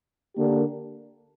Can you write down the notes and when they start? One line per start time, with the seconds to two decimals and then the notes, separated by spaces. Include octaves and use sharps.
0.36 D3 A#3 D4 G4 A#4